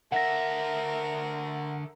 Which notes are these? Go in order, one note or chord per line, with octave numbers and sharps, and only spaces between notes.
D3 A#4 E5 F#5 A#6